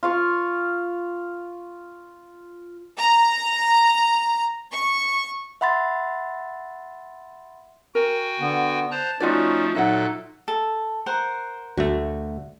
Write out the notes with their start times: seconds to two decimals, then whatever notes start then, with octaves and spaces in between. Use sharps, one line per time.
0.03 F4 F5 C#6
2.98 A#5
4.73 C#6
5.61 E5 F#5 B5 C6 A6
7.95 F#4 A#4 G5 G#5
8.40 D3 B3
8.91 C5 A5 A#5 F#6
9.20 F3 A3 C#4 D#4 F4 F#4 D5
9.75 A#2 F#3 D#4 A4 E5 F#5 F#6
10.48 A4
11.06 A#4 C5 F#5
11.78 D2 A3 F#4